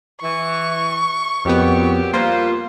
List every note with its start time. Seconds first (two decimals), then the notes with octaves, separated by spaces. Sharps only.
0.22 E3 C#6
1.45 F2 A#2 F#3 B3 G4
2.13 G3 A#3 F4 B4 C5